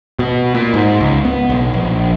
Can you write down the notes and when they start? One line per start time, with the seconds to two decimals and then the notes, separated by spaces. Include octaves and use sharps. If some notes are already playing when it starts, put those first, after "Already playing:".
0.19 B2
0.55 A#2
0.74 G#2
1.01 C#2
1.25 B3
1.49 B1
1.73 A#1